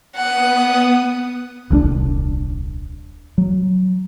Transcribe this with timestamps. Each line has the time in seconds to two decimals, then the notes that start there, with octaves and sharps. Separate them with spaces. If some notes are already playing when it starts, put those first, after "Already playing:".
0.16 B3 F#5 D#6
1.70 D#1 C2 C#4 D4
3.38 F#3